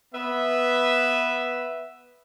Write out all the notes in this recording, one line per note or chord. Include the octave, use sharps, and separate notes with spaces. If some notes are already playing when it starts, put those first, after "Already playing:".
B3 B4 E5